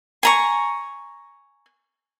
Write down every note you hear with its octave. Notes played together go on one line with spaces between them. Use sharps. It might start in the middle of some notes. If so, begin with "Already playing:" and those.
G#5 A#5 C#6